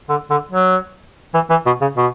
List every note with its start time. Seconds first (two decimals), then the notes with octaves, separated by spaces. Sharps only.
0.09 D3
0.30 D3
0.51 F#3
1.34 E3
1.50 E3
1.66 B2
1.81 C#3
1.97 B2